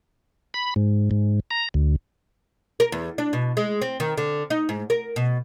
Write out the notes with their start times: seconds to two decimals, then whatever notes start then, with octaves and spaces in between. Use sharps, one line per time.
0.54 B5
0.76 G#2
1.11 G#2
1.51 A#5
1.74 D2
2.80 A#4
2.92 E2
3.18 D4
3.33 B2
3.57 G#3
3.82 C4
4.00 D#3
4.17 D3
4.50 D#4
4.69 G#2
4.90 A#4
5.16 B2